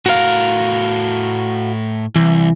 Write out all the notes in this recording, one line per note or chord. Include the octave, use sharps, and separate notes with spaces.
A2 F#4 A#4 F5
C2 E3